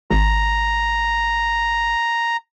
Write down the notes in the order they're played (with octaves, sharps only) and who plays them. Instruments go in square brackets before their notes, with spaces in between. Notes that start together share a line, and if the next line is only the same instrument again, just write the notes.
[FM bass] G#1 [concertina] A#5